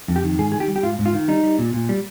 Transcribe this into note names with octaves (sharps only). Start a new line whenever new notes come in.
F2
G4
D#3
G#2 G#4
D#3 G#4
G4
G3
G4
G#2 F4
G#2
F4
D#3
G3 D#4
G3
A#2
A#2
G3